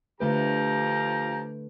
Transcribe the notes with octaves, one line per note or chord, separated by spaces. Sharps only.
D3 F3 A3 G4 B4 A#5